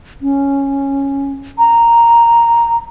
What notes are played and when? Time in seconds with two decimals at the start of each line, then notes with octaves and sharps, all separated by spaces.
0.22 C#4
1.58 A#5